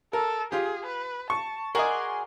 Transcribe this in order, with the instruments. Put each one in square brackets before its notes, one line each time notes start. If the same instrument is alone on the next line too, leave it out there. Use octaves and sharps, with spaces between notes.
[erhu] A4 [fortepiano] A#4
[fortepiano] F4 G4 [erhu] G#4
[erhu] B4
[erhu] A5 [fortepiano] C#6
[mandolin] F#4 G#4 D5 [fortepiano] A#4 D#5 [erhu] C6